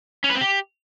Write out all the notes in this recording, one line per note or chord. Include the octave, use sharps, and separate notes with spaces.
C#4
B4
C4
G4